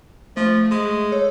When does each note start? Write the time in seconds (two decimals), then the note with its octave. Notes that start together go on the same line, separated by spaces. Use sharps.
0.37 F3 A3
0.71 G#3
1.12 A4 C#5